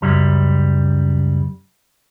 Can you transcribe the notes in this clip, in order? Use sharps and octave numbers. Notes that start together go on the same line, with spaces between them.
C#2 F#2 G3